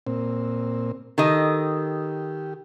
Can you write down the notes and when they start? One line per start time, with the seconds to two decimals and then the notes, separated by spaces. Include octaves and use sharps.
0.07 A#2 C4
1.18 D#3 G4 A4 D#5